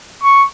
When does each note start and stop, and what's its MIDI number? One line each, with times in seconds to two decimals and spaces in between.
0.23 0.45 85